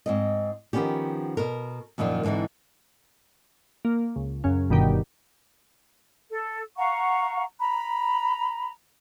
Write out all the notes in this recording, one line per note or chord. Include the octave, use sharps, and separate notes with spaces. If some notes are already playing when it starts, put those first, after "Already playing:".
G#2 C4 D#5
D#3 F3 G#3 B3 C#4 G4
B2 A#4
F#2 A#2 D#3 F3 A#3
G#2 D3 E3 C4 D#4
A#3
C#2
F#2 C#3 C#4
G1 G2 B2 D#3 G4
A4
F5 F#5 A#5 C#6
A#5 B5